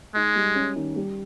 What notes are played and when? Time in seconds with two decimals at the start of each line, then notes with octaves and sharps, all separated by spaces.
0.15 G#3 D#4
0.36 G3
0.55 C#4
0.76 D#3
0.96 G3